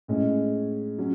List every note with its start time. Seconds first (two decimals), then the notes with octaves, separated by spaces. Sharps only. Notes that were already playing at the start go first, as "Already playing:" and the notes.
0.08 A2 G#3 C#4
0.98 F#3 C#4